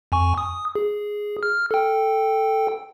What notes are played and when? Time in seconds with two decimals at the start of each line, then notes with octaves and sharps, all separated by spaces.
0.12 F2 G#5 C#6
0.38 D#6
0.75 G#4
1.43 F6
1.71 A4 G5